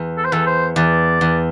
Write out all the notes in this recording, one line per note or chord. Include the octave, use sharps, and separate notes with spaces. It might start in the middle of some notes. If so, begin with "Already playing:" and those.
Already playing: E2
A4
C5
E2 A4
C5
E2 D5
E2